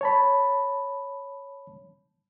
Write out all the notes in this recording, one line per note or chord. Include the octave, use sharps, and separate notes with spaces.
C#5 A5 B5